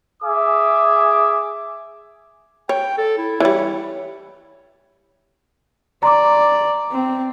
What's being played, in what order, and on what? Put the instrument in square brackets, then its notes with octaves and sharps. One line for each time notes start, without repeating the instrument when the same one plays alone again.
[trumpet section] G#4 E5 G#5 D6 D#6
[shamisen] C#5 [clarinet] G5
[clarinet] A4
E4
[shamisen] E3 G3 [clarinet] C#5
[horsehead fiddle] D5 [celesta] A#5 C6 D6
[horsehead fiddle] C4